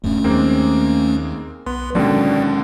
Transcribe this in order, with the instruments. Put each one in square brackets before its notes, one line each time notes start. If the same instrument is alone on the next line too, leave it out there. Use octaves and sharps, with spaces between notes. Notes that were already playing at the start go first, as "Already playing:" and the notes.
[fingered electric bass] D1 F#2 [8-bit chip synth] A3 C#4
[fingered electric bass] D#2 [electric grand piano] G#3 A#3 C4
[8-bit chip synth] B1 B4 C6 [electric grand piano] B3
[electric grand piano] D#2 B2 D3 [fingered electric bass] F#3 G#3 C#4 [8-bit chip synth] D5 G5